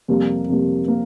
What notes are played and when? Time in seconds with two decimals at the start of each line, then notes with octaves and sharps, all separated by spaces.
0.08 F2 C3 G3 A#3
0.48 F2 C3 G3 A#3
0.88 A#3